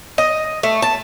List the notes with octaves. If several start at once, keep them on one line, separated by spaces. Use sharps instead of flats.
D#5
A3
A5